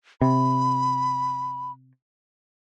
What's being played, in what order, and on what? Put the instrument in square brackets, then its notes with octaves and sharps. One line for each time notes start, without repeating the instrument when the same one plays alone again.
[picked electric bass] C3 [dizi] B5